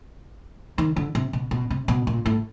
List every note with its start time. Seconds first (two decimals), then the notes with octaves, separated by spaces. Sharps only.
0.78 D#3
0.96 D3
1.15 C3
1.33 B2
1.51 B2
1.70 C3
1.88 B2
2.07 A#2
2.26 A2